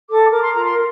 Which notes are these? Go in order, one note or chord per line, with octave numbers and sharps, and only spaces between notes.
A4 D6
A#4 D6
C6
F4 A#5
C6